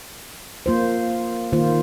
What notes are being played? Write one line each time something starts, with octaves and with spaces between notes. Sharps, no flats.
A#3 F4 C5
D#3 A#3 F4 C5